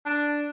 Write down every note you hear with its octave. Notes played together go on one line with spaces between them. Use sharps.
D4